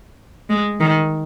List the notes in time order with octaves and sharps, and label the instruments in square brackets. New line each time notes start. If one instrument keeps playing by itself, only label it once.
[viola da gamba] G#3
D#3